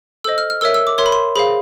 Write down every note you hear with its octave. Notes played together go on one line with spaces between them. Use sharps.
A4 C5 D#5 E6
F6
F6
A#4 C#5 E5 E6
E6
D6
A#4 C#5 E5 C6
B5
C6
G#4 C5 F5 B5